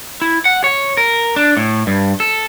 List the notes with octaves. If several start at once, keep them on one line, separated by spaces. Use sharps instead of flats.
E4
F#5
C#5
A#4
D4
A2
G2
A4